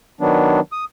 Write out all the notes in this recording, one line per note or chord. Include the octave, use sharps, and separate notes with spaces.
D#3 F#3 B3 D4
D#6